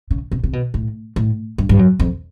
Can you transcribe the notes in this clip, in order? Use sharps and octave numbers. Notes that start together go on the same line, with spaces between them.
C#3
C3
C3
B2
A2
A2
G2
G2
F#2
F2